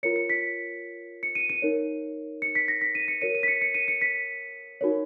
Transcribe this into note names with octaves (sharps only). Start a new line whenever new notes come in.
F4 A#4 C#5 C#7
C#7
B6
C#7
D#7
D#7
D#4 A#4 C#5
C#7
B6
A#6
B6
D#7
C#7
F#4 A#4 C#5 D#7
D#7
B6
C#7
C#7
D#7
C#7
B6
D#4 F#4 A#4 C#5